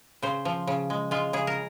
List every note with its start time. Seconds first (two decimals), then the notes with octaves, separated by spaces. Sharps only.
0.22 C#3 C5
0.45 F3
0.67 C#3
0.90 G#3
1.11 G#3 F4
1.33 C#3 G#4
1.47 A#4